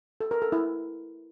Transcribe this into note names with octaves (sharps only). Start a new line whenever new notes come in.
A4
A#4
A4
E4